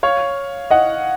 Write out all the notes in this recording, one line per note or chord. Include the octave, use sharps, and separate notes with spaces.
C#5 F5
D#5 F#5